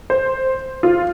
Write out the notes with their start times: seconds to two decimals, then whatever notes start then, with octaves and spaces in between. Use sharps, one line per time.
0.10 C5
0.83 F4